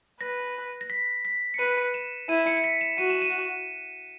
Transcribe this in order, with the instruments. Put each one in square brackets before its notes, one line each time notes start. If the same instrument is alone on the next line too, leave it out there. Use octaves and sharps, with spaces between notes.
[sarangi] B4 [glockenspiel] A#6
[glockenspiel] A#6
B6
B6
C#7
[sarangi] B4 [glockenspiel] D#7
[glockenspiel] E7
[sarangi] E4 [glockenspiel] D#7
[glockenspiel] C#7
C#7
B6
E7
[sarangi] F#4 [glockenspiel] D#7
[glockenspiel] E7
D#7